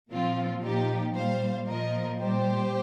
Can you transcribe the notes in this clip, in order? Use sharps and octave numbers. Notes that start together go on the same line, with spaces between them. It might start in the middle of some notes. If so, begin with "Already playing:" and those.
A#2 F3 C4 F4
A#2 F3 D#4 G4
A#2 G3 C5 F5
A#2 F3 A#4 D#5
A#2 G3 G4 C5